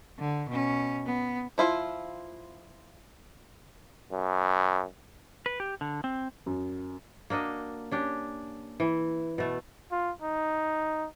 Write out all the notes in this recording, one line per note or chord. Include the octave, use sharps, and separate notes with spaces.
D3
B2 C#4
B3
F3 E4 F4
F#2
B4
G4
D3
C4
F#2
A#3 D4 F#4 D#5
C#4 D4 G4
E3
B2 A3
F4
D#4